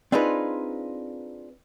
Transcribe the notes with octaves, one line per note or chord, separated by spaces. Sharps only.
C4 D4 D#4 F4 G#4 B4